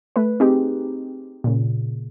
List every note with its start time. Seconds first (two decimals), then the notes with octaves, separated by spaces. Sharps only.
0.16 A3 B4
0.40 C4 D#4 G4 G#4
1.44 A#2 C#3